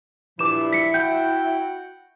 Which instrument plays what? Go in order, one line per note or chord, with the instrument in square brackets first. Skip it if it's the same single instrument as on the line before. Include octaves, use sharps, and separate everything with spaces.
[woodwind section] G2 A#2 F3 [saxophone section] E4 [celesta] D6 E7
[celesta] B6 C#7
[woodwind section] F#4 F#5 G5 [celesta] G6